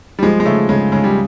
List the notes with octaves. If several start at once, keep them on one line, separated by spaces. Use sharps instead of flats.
G3
F3 G#3
G#3
C#3 A3
C#3 G#3
C#3 G#3
G3